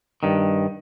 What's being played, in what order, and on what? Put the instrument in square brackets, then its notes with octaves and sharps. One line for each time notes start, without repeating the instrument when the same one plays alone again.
[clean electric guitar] G2 D#3